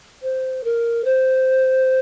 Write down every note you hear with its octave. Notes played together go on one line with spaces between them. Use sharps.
C5
A#4
C5